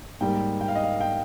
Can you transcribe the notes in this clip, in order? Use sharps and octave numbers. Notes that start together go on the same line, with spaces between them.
G#2 G3 A#3 G5
G5
F5
D#5
F5
G5